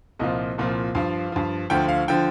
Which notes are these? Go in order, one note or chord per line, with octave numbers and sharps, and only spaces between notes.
C2 A#2 F3 D#5
C2 A#2 F3
G2 F3 F5
G2 F3
D2 D3 F3 G5
F5
D3 F3 G5